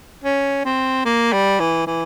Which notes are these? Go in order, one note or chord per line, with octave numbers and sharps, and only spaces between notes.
C#4
C4
A#3
G3
E3
E3